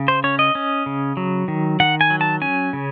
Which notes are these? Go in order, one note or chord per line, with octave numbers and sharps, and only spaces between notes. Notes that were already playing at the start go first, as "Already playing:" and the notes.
Already playing: C#3
C5
C#4 C#5
D#5
C#4
C#3
F#3
D#3
D#3 F#5
G#5
F#3
A5
C#4 G#5
C#3